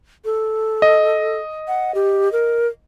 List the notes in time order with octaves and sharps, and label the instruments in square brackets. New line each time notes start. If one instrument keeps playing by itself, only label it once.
[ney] A4
[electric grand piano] D#5
[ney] F#5
G4
A#4